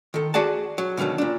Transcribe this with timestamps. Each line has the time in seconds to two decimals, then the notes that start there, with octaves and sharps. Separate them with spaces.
0.14 D#3 A4
0.34 F#4 G#4 D5 F#5 A5
0.78 F#3
0.97 B2 D3 D#3 F3 F#3
1.18 A#2 D4